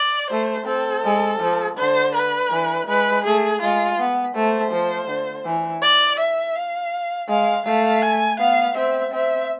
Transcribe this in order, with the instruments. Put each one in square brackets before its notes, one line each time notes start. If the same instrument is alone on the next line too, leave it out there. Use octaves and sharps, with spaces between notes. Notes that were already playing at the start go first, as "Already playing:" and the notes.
Already playing: [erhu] D5
[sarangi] A3 [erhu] C5
[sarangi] C4 [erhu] A4
[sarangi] G#3
F3
[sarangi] D3 [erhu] C5
[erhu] B4
[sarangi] E3
[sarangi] G#3 [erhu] B4
[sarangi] A3 [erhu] G#4
[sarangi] G#3 [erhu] F4
[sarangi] B3
[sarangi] A3 [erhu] C5
[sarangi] F3
D3
E3
[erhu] D5
E5
F5
[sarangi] G#3 [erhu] F5
[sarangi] A3 [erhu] F5
[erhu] G#5
[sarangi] B3 [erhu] F5
[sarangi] C4 [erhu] E5
[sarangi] C4 [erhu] E5